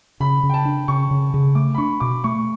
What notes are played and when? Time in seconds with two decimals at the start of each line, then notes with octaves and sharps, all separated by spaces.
0.20 C#3 B5
0.43 C#3
0.50 G5
0.54 A5
0.65 D4
0.88 C#3 C#6
1.11 C#3
1.34 C#3
1.55 A3 D6
1.75 B5
1.78 D4 C#6
2.00 B2 D6
2.24 A3 C#6